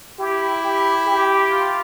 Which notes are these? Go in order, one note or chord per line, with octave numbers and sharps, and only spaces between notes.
E4 G4
G4
G4
F4